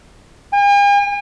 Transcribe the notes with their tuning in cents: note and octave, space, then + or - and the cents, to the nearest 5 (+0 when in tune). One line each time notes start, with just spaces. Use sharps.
G#5 -45